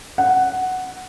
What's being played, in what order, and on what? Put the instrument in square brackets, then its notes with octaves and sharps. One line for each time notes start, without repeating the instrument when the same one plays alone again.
[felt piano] F#5